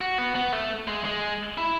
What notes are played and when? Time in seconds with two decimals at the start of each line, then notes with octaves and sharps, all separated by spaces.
0.01 F#4
0.18 B3
0.35 B3
0.52 A3
0.87 G#3
1.05 G#3
1.58 E4